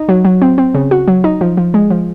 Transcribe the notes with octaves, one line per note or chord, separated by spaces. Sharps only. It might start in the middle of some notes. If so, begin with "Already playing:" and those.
Already playing: D#4
F#3
F#3
C4
C4
C#3
F#4
F#3
D#4
F3
F3
G#3
F3